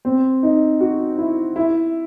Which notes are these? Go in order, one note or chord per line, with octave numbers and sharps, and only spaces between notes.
C4
D#4
F#4
E4
E4